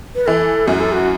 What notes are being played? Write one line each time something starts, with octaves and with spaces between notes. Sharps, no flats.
B4
E3 A4
F#2 F#4
A4
F#4